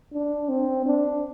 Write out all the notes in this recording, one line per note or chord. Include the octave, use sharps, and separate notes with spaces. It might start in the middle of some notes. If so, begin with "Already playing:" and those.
D4
C4
D4